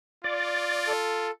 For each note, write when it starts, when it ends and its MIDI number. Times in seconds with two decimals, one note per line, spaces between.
0.24 1.29 65
0.24 0.93 74
0.87 1.31 69